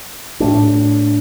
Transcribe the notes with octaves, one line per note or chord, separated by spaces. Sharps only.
A2 A3 D4